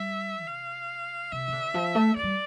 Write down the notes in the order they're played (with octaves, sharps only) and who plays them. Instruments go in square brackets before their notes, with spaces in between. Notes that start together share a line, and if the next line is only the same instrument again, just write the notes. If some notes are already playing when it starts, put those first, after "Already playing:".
Already playing: [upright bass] G3 [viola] E5
[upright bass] C3 [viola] F5
[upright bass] C3 [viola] E5
[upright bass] E3
D3
F3
A3
[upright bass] A3 [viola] D5
[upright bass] G3